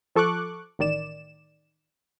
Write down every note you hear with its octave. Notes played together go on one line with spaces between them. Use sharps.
F3 A4 C#6 D6 F#6
A1 D#3 D5 E7